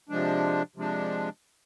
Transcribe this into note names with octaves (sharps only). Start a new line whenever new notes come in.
C3 F3 G#3 D4
C3 F3 G#3 D4